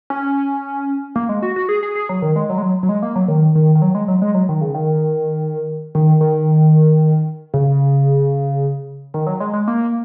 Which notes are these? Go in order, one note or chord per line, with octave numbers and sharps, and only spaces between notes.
C#4
A#3
G#3
F#4
F#4
G#4
G#4
G#4
F#3
D#3
G#3
F#3
G#3
F#3
F#3
G#3
A#3
F#3
D#3
D#3
D#3
F#3
G#3
F#3
G#3
F#3
D#3
C#3
D#3
D#3
D#3
C#3
D#3
F#3
G#3
G#3
A#3